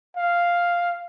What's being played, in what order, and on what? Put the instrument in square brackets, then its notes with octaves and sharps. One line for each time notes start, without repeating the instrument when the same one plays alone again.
[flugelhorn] F5